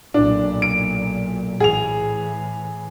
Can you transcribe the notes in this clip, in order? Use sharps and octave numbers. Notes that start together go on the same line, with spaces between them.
B1 A#2 D4
D7
A2 E3 G#4 F7